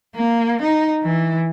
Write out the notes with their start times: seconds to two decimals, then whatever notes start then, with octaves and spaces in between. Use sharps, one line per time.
0.15 A#3
0.62 D#4
1.03 E3